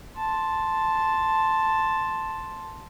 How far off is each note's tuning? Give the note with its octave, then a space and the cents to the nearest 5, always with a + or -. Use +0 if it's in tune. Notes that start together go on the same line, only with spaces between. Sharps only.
A5 +0 C6 +0